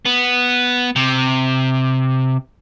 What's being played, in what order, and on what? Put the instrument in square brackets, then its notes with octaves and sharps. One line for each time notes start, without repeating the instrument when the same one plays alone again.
[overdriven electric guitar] B3
C3